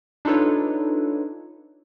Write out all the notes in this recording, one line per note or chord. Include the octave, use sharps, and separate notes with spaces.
D4 D#4 F4 A4 B4 C#5